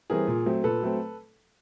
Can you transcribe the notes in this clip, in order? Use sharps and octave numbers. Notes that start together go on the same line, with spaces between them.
E3 G3 C4 G#4 A#4
A#2
F#3 A3 C4
A#2 A4 B4
F#3 A3 C4